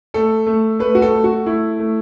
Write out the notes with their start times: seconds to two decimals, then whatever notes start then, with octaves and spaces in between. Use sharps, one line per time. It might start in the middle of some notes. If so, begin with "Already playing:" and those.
0.14 A3 A4
0.47 A3
0.79 A3 B4
0.95 F#4
1.02 A4
1.13 A3
1.24 F#4
1.46 A3 E4
1.79 A3